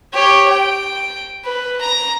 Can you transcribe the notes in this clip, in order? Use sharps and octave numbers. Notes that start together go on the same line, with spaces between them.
G4 C#5
G5
B4
A#5